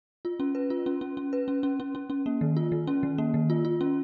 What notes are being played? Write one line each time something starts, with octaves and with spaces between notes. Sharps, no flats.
F4
C#4
B4
F4
C#4
C#4
C#4
B4
C#4
C#4
C#4
C#4
C#4
A#3
D#3
F4
D#3
C#4
D#3
A#3
D#3
F4
F4
C#4